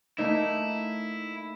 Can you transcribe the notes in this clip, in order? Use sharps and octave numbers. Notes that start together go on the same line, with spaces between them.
A3 A#3 D#4 E4